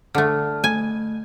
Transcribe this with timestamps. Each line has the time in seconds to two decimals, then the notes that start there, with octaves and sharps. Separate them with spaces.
0.15 D3 A3 D5 A5 F6
0.64 A3 G#5